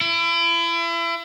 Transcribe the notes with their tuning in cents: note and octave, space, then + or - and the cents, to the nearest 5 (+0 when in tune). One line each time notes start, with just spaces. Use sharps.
E4 +35